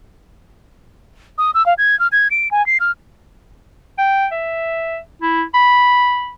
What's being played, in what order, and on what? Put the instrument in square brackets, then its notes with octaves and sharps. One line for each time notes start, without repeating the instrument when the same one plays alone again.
[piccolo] D#6
E6
F5
G#6
F6
G#6
D7
G#5
C7
F6
[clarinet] G5
E5
E4
B5